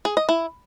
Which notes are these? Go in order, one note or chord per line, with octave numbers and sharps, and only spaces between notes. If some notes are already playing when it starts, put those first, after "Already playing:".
G#4
D#5
E4